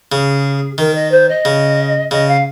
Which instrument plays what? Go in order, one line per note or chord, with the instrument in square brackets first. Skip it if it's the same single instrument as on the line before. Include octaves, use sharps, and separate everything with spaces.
[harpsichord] C#3 [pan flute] G#4
[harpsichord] D#3 [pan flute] A#4
[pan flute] D#5
C5
D#5
[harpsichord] C#3
[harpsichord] C#3 [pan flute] D#5
[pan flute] F5